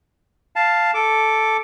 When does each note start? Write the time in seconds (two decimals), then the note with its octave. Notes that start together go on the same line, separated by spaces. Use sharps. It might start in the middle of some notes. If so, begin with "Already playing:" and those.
0.56 F5 A5
0.94 A4 D6